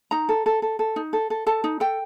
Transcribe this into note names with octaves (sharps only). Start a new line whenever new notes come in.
D#4 A#5
A4
A4
A4
A4
D#4
A4
A4
A4 A5
D#4
A4 G5